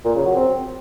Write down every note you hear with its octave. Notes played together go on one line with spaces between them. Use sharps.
A#2
C#3
F#3
C4